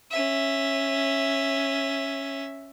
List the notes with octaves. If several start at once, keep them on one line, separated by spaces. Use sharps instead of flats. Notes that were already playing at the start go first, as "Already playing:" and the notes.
C#4 E5